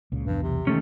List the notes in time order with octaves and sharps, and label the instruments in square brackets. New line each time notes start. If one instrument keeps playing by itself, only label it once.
[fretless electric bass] C#2 A#2 C#3
[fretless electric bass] B1 E2 [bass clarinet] G2
[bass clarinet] C3
[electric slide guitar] D#3 A3 C#4 [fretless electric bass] E3 A#3